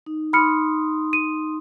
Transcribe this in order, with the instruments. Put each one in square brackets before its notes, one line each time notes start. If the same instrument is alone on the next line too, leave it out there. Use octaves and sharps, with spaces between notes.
[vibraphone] D#4
[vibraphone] D#4 C6 D#6 [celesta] B5 F6 C#7
[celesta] D#7